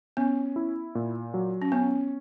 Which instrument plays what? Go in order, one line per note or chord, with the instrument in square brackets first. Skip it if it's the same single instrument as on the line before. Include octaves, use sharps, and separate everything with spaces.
[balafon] B3 [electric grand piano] C#4
[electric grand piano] E4
A#2
F#3
[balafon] C#4
[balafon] B3 [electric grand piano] C#4